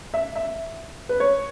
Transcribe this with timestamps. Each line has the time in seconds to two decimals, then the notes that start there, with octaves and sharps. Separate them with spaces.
0.14 E5
0.36 E5
1.09 B4
1.20 C#5